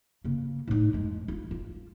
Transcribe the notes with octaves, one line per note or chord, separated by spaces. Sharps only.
C#3 A#3
A2 D#4
F2 G#3
E4 F4
F4